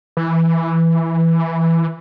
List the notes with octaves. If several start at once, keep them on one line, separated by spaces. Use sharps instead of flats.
E3